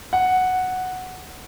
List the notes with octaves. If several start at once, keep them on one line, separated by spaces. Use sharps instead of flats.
F#5